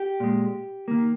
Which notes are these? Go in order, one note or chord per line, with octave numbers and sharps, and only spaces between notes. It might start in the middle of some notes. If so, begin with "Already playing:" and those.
Already playing: G4
A#2 G#3
D#3 A#3